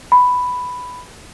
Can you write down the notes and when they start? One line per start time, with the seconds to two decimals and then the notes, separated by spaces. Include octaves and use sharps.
0.12 B5